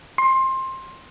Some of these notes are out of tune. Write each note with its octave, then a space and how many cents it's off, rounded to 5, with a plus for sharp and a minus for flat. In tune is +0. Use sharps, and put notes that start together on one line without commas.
C6 +20